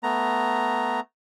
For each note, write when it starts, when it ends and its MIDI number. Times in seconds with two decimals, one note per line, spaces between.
0.03 1.00 57
0.03 1.00 59
0.03 1.00 82